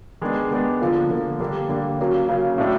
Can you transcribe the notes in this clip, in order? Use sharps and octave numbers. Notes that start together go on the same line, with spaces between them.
D#3 G#3 B3 D4
D#3 G#3 B3 D4
D3 F3 A#3
D3 F3 A#3
D3 G3 A#3 D4
D3 G3 A#3 D4
C#3 F#3 A#3 C#4
C#3 F#3 A#3 C#4
A2 F#3 A3 D4